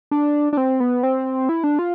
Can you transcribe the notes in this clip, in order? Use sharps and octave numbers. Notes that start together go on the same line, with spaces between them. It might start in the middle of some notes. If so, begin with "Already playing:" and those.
D4
D4
C4
B3
C4
E4
D4
F4